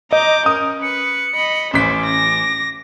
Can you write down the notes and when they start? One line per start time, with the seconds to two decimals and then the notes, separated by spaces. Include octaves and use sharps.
0.13 D#5 A#5 D6 G6
0.46 C#4 A#4 D#6
0.82 B4 C#7
1.36 D#5 B5
1.73 A1 C#4 C5 D6 B6
2.06 A#6